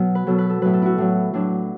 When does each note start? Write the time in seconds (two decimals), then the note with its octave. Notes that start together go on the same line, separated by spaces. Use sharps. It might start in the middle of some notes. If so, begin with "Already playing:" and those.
Already playing: B2 F#3
0.15 B4
0.27 B2 F#3 A4
0.38 B4
0.50 A4
0.61 A2 F#3 B4
0.73 A4
0.82 E4 F#4
0.98 A2 F#3
1.33 A2 F#3 D4